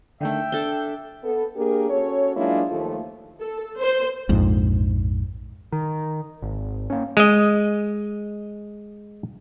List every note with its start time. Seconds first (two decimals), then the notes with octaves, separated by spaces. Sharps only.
0.21 D3 D#3 A3 E5 G5
0.52 D4 A4 G6
1.23 B3 A4
1.56 A#3 D4 G4 G#4 A#4
1.90 C#4 F#4 A4 C#5
2.36 F#3 G#3 A#3 D4 E4 F4
2.70 D#2 F3 A3
3.39 A4
3.77 C5
4.29 A#1 F2 G#2
5.72 D#3
6.42 G#1
6.90 A#3 C#4
7.17 G#3 D#5